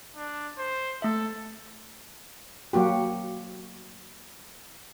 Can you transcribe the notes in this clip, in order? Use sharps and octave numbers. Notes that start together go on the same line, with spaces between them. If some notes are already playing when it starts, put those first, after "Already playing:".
D4
C5
A3 A4 E5
F#3 A#3 F#4 G4